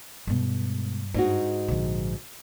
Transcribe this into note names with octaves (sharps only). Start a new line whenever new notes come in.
G2 B2 G#3
G#2 D4 D#4 F#4
A#1 D3 F3